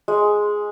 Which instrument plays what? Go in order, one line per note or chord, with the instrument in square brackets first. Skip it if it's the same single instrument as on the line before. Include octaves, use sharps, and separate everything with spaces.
[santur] G#3